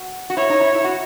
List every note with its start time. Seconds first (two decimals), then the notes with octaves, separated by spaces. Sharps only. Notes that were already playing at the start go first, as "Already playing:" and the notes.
Already playing: F#4
0.30 F#4
0.37 E4 C#5
0.50 D#4
0.60 E4
0.72 E4
0.84 F#4